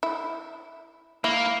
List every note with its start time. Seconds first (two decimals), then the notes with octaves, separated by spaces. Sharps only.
0.03 E4
1.24 A#3 E4